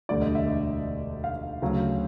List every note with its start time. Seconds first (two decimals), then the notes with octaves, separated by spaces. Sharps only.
0.09 E1 D2 D3 G3 D5
0.22 D#5
0.35 E5
1.24 F5
1.62 D2 C#3 F#3